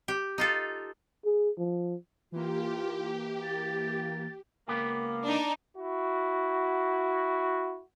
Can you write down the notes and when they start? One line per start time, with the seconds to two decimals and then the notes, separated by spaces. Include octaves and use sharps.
0.08 G4
0.38 D#4 F4 A4
1.25 G#4
1.58 F3
2.32 E3 A#3 F4 G4
3.43 A6
4.68 C#2 A#3 B3 G4
5.25 D4 D#4
5.76 E4 F#4